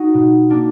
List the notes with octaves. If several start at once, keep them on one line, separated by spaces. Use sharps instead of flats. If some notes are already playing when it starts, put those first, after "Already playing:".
Already playing: D#4 F#4
B2
A#3 D4